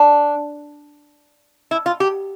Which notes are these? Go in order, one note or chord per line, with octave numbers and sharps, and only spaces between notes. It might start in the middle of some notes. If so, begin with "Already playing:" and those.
Already playing: D4
E4
F4
G4